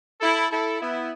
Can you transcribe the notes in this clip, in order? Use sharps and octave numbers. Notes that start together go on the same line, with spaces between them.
E4 A4
E4 A4
B3 E4